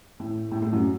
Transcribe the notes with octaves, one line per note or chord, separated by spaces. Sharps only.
A2 A3
A2 A3
A2 A3
F#2 F#3